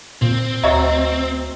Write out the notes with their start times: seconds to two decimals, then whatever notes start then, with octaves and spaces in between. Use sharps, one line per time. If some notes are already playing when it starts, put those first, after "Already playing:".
0.22 A#2 C4
0.64 D2 F#4 C#5 D#5 E5 A#5